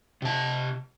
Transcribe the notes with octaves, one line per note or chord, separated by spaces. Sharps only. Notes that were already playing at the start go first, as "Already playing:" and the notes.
C3 A5